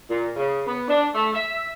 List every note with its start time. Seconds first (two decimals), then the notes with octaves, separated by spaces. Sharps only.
0.10 A#2
0.36 C#3
0.67 B3
0.88 D4
1.15 A3
1.34 E5